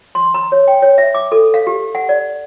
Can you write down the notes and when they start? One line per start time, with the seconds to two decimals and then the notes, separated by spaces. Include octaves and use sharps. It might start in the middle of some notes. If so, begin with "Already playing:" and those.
0.15 C6
0.34 A#5
0.52 C#5
0.68 G5
0.82 C#5
0.98 E5
1.15 D6
1.32 A4
1.54 F5
1.67 G4
1.95 F#5
2.09 D5